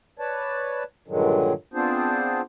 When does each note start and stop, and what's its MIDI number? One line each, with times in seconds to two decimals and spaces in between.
0.19 0.83 71
0.19 0.83 73
0.19 0.83 74
0.19 0.83 81
1.08 1.53 43
1.08 1.53 46
1.08 1.53 50
1.08 1.53 51
1.08 1.53 54
1.08 1.53 56
1.74 2.41 59
1.74 2.41 60
1.74 2.41 62
1.74 2.41 65
1.74 2.41 68
1.74 2.41 72